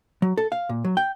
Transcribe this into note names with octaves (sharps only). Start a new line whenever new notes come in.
F#3
A4
F5
A#2
F#3
G5